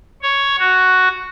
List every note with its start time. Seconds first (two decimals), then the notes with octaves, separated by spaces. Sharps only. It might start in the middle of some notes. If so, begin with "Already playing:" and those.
0.22 C#5
0.59 F#4